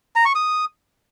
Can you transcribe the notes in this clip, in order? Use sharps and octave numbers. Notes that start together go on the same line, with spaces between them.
A#5
C#6
D#6